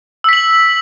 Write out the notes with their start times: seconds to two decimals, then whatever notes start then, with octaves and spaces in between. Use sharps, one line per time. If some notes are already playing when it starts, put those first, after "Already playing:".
0.24 E6
0.29 B6
0.33 F#7